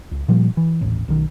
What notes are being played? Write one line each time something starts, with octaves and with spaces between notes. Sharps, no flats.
C#2
A#2 F3 G3
E3
D#1 A1
B1 D#3